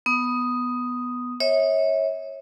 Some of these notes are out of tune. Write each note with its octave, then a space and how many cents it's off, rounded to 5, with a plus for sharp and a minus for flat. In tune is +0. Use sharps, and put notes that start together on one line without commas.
B3 +0 D#6 +0
C#5 -20 E5 -35